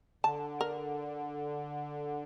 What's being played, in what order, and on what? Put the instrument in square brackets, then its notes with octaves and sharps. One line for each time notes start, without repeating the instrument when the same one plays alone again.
[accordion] D3 [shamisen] A5
[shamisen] A#4